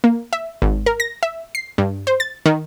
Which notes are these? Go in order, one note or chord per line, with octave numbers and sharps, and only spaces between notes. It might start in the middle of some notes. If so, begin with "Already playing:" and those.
A#3
E5
G#1
A#4
A#6
E5
C7
G2
C5
A6
D#3